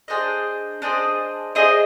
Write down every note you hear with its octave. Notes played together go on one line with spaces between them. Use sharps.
D4 G#4 C5 D#5
D4 G#4 C5 D#5
D4 G#4 C5 D#5